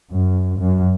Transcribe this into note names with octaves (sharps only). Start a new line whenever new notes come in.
F#2
F#2